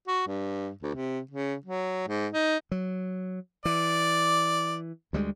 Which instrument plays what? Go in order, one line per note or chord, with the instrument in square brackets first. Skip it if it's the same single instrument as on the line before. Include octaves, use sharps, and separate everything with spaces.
[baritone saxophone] F#4
G2
D2
C3
C#3
F#3
G#2
D#4
[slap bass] F#3
[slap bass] E3 [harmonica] D5
[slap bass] D2 G3 G#3